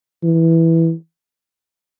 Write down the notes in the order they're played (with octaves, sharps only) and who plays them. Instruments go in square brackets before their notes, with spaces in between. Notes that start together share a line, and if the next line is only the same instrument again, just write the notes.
[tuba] E3